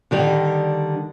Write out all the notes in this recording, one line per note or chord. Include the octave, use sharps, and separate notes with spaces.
D3 D#3 G3